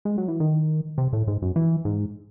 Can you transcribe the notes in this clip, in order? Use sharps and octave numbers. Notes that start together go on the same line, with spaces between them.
G#3
F#3
E3
D#3
C3
A2
G#2
F#2
E3
G#2